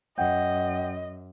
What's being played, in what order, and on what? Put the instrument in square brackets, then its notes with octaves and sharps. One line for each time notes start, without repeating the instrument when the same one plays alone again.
[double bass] F#2 [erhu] D#5 [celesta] F#5 G5 G6